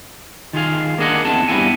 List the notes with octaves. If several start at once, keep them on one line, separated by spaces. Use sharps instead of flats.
D#3 F4 G#4 F5
A#3 D4 G#4 D#5 F#5
E2 C4 F#5 A5
G2 G3 B3 E4 F#5 G#5